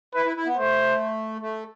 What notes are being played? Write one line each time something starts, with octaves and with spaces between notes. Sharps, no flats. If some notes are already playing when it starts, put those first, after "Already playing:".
E4 B4
E4
E4
B3
A3 C5
A3